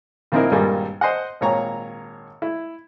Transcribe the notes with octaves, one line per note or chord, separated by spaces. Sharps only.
A#2 F3 C4 D#4 E4 A#4
G#1 G2 A#2 G3 A#3
C5 D#5 F#5
G#1 A#2 C#5 A#5
E4